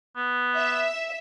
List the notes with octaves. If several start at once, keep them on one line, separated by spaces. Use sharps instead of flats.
B3
E5